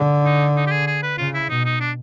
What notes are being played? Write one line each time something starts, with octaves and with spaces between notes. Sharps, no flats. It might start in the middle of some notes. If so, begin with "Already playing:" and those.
Already playing: D3
D#4
D#4
G4
G#4
G#4
B4
C#3 F4
E4
B2 D#4
D#4
D4